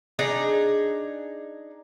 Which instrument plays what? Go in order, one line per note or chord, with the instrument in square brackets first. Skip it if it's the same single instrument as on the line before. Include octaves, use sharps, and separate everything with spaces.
[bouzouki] D4 D#4 G#4 A#5